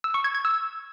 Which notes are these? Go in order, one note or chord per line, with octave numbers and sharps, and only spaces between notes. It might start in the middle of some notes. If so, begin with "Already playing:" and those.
E6
C#6
G#6
G#6
E6